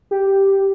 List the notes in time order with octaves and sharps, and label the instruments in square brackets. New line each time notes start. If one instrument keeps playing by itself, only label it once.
[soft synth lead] G4